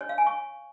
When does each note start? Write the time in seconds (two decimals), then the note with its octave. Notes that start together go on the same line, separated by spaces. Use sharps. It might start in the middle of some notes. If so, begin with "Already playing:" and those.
0.01 C#5
0.09 F5
0.18 G#5
0.27 C#6